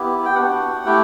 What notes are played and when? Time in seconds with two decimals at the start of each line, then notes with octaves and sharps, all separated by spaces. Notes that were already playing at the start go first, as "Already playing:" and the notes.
Already playing: B3 E4 G4
0.25 G5
0.35 B3 D4 F#4 F#5
0.85 A3 E4 G4 G5